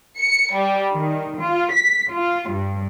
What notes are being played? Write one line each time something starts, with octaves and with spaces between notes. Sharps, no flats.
C#7
G3
D#3
F4
B6
F4
G2